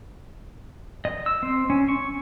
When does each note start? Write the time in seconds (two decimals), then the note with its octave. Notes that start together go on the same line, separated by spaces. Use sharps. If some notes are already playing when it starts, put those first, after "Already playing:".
1.05 D#5
1.26 E6
1.43 C4
1.70 C#4
1.88 C#6